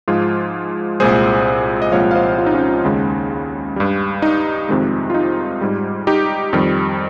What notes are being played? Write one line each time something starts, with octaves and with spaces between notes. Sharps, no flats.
G#2 F3 G#3 F4 G#4
C2 A#2 G#3 G#4 C5
D#5
C2 A#2 F3 G#3 C#5 F5
F5
C5 D#5
F4
D#4
C#4 F4
D#2 C#3 G#3
G2 G3
D#4
F2 C3 D#3 G#3
F4
D#4
G#2 G3
D#4 G4
F2 D#3 G3